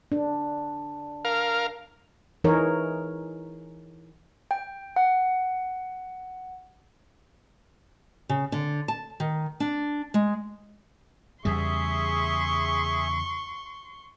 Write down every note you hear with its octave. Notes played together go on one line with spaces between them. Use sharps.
D4
A#4 F5
E3 D#4 G#4 A#4 C#5
G5
F#5
C#3
D3
A5
D#3
D4
G#3
E2 C#3 G3 G#4 E5 C6 C#6